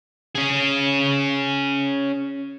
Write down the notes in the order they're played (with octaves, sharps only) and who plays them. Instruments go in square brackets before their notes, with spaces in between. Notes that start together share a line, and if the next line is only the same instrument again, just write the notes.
[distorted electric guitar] C#4 G#4